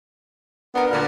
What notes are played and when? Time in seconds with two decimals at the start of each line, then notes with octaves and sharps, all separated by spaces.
0.75 B3 D4 A#4
0.91 D2 A#2 D3 F6